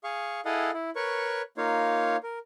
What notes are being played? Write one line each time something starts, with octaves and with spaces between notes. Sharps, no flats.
G#4 F5 C#6
E4 G#4 A4 D#5 F5 F#5
E4
A#4 B4 C#5 C#6
A#3 D#4 F4 C#5 F5
A#4